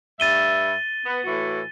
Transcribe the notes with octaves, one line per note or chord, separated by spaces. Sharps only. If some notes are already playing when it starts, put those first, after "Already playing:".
G2 E5 A6 D#7 G7
B3
A2 E3 F#4